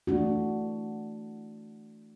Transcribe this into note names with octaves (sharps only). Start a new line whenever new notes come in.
E3 A3 D4 F#4